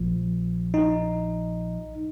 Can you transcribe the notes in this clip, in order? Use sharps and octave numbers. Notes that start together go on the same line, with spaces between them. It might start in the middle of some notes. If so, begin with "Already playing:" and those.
Already playing: A#1 A#2 F3
D#4